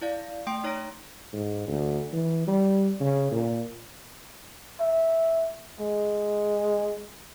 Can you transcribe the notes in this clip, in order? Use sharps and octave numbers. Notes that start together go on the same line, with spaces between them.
E4 D5 F5
A3 G5 C6 D7
D#4 C#5 A#5 A#6 D7
G#2
D2
E3
G3
C#3
A#2
E5
G#3